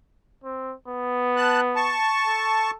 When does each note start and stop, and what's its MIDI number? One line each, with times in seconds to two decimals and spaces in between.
0.44 0.74 60
0.88 1.99 59
1.37 1.61 81
1.37 1.61 90
1.76 2.71 81
1.76 2.71 85
2.27 2.77 69